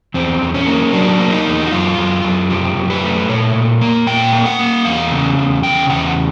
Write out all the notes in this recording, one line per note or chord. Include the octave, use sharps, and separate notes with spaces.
E2 C4
E2
C#4
A#3
F#3 D4
A#3
D#4
E2
F#4
F#2 F4
F#2
F#2
F3 G4
F#2
B4
A3
A#2 C#5
A#2
A#3
A#2 G5
A#3
F#5
A#3
E2 F5
C#3
E2
C#3 G5
E2 F#5